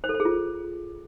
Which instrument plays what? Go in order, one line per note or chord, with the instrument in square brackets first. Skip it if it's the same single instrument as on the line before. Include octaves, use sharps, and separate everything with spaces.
[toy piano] C5
A4
C5
G#4
F4